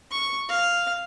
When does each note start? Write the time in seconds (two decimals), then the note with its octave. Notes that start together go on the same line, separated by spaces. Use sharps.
0.11 C#6
0.49 F5